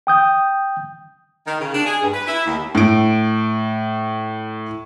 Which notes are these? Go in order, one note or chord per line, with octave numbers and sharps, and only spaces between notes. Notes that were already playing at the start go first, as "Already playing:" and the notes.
G5 D#6 G6
D#3
C#3
D4
G#4
G2
B4
E4
D#2
A2 D7